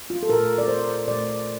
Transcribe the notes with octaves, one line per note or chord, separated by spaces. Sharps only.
F4
A4
A#2 A3 A#4
D5
C5
A#2 A3 D5